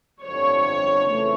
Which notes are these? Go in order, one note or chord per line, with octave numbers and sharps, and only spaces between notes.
G1 F2 D3 C#5
F2 C#3 E3 A3